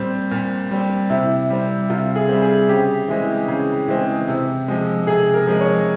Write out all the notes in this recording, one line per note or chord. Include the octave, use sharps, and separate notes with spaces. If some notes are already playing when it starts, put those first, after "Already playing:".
Already playing: A#2 G3 C4
A#2
G3 C4
C3 E4
G3 C4
C3 F4
G#4
G3 C4
G#4
C#3 G4
E3 G#3 C4
C#3
E3 G#3 C4
C3
F3 G#3
C3 G#4
A#4
F3 G#3
C#5